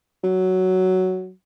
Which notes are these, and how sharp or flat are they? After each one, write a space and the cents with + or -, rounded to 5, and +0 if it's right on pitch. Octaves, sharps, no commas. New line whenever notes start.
F#3 +5